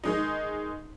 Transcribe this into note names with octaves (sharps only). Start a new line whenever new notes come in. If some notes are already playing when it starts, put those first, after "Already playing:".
D#3 G#3 D#4